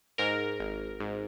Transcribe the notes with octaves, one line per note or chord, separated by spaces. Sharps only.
G#2 A#4
G#1
G#2